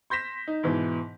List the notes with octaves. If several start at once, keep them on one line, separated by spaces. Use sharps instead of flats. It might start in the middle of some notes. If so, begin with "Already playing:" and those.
C6 G6 A#6 B6 E7
D#4
G#2 B2 E3